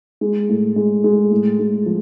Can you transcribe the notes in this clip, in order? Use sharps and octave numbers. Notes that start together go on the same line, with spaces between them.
G#3
A2
G#3
G#3
A2
G#3
F3